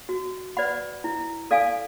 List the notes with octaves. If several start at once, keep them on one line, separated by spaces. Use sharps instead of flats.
F#4
B4 D5 F#5 B5
E4
A4 D5 F5 G#5